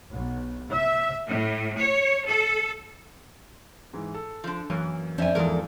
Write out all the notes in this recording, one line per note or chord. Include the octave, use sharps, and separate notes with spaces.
B1
E5
A2
C#5
A4
G#2 E3
A4
F3 D4
F#2 E3 A#3
F2 C#4 D4 C5 E5 G#5
E2 G#2 E3 F3 B3 A4 A#4